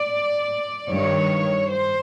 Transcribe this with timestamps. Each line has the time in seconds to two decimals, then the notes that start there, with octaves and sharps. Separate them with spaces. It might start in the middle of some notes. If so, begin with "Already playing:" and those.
Already playing: D5
0.90 G2 D#3 C#5
1.70 C5